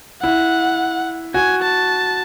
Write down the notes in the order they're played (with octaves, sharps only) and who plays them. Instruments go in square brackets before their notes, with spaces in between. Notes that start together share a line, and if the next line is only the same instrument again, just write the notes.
[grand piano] E4 [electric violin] F#5
[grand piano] F#4 [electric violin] G#5
[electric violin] A5